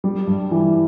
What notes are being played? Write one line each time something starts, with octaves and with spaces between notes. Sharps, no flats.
G3
G2
E3